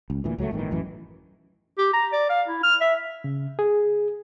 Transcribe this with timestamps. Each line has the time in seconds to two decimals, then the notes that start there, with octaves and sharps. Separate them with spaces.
0.10 C#2
0.24 D2 A#2 E3
0.38 C#2 F#3 G#3 A3
0.51 G1 A2 D#3 E3
0.71 A1 F#2 E3
1.78 G4
1.93 A#5
2.13 D5
2.29 F5
2.48 E4
2.63 F6
2.81 E5
3.24 C#3
3.59 G#4